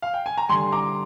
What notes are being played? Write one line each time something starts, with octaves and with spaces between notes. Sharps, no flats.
F5
G5
G#5
A#5
D3 G3 G#5 C6
A#5 D6